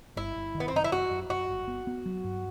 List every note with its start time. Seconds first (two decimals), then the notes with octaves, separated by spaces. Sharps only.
0.16 G1 E4
0.36 G1
0.55 D#3
0.60 B3
0.68 C4
0.73 F#2 D#4
0.84 E4
0.92 F#2 F#4
1.10 F#2
1.29 F#2 F#4
1.49 G1
1.68 B3
1.87 B3
2.06 F#3
2.24 G2